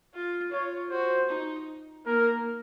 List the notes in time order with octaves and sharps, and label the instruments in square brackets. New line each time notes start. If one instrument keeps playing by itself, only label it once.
[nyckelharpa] F4
[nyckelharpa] F4 [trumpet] C#5
[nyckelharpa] F#4 [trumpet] C5
[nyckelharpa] D#4
[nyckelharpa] A#3 [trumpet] A#4